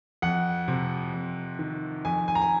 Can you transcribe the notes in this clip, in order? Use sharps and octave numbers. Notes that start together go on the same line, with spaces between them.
F2 F#5
C3
F2
D#3
F2 G#5
G#5
A#5
G#5